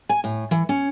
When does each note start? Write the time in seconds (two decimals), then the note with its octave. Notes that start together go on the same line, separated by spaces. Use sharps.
0.09 G#5
0.24 A2
0.51 E3
0.69 C#4